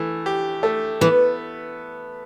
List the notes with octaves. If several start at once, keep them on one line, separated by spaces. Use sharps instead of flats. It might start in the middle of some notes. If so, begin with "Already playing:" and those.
Already playing: E3 A3
G4
A3
E3 B3